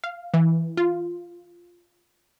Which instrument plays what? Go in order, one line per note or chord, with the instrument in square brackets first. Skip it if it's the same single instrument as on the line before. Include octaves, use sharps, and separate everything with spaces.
[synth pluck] F5
E3
F4